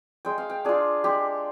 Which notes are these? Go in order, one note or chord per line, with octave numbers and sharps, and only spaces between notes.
G#3 G5
F5
G5
D4 F4 G#4
G#3 G4